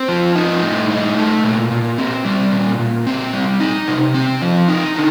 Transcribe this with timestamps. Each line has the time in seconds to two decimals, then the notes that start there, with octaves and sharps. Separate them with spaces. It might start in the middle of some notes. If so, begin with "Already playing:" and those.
Already playing: C4
0.08 F3
0.35 D#4
0.62 A2
0.90 D#4
1.17 A3
1.44 A#2
1.71 A#2
1.98 C4
2.25 G3
2.52 A#2
2.79 A#2
3.06 C4
3.33 G3
3.60 D#4
3.88 C3
4.14 C4
4.42 F3
4.68 D#4
4.96 D3